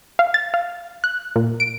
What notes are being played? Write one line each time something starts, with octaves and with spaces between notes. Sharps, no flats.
F5
A6
F5
F#6
A#2
D7